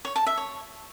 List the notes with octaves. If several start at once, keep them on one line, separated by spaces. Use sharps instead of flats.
C#5
A5
E5
C#5